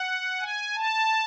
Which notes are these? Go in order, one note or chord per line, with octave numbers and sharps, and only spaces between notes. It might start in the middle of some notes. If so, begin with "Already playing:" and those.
Already playing: F#5
G#5
A5